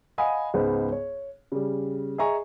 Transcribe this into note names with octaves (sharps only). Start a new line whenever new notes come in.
D#5 F5 F#5 G#5 B5 D#6
C#2 G#2 B3 C5
C#5
C#3 G3
G#4 D#5 E5 G#5 A#5 C#6